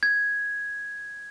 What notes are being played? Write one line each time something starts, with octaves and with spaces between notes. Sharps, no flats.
G#6